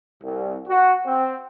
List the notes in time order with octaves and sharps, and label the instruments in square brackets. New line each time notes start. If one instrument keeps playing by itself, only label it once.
[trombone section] C2
F#4
C4